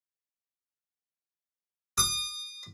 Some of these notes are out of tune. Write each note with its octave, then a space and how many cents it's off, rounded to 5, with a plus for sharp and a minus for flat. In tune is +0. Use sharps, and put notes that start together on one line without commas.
D#6 -40